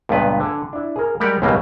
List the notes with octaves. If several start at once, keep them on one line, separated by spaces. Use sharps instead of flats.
C#2 G2 A#2 B3 B4
D3 G#5
D4 E4
G#4 A#4
G3 G#3 G4 A#4 D5 F#5
C#2 G#2 B2 F#3 G3 A#3